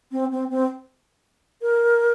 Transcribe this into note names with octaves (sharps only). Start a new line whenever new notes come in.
C4
C4
C4
A#4